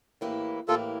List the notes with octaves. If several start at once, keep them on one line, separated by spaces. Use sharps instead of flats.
A2 E3 A#3 E4 G4
A2 E3 A#3 E4 F4 G4 A4